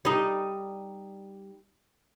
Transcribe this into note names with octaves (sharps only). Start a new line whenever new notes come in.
G3 D#4